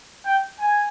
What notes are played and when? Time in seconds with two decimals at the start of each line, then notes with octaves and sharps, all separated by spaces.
0.26 G5
0.59 G#5